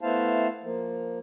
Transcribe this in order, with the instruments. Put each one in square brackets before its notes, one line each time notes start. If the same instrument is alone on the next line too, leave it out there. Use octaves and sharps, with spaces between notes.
[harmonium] A3 B3 E4 C5 F5 A5
F3 A#3